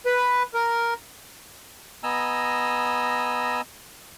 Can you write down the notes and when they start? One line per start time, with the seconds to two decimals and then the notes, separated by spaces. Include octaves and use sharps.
0.06 B4
0.54 A#4
2.03 B3 D#5 G#5 A#5 E6